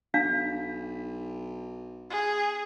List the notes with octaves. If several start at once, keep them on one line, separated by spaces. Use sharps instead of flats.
B1 D4 F5
G#4